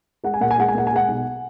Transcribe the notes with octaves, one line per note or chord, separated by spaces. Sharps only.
G#3 F#5
G#5
A#2 F#5
G#5
G#3 F#5
G#5
A#2 F#5
G#5
G#3 F#5
B1